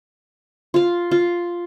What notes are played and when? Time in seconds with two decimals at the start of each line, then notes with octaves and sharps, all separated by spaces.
0.74 F4 F5
1.11 F4